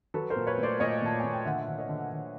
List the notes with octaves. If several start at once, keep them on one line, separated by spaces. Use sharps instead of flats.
F#3 A4 B4
A#4 C5
A#2
B4 C#5
A3
C5 D5
A#2 C#5 D#5
A#2 A5
A#2 G#5
G5
D3 E5 F#5
D3
C#5 D#5
D3
D3